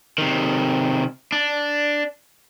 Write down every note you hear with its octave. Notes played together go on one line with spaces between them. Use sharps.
C3 D#3
D4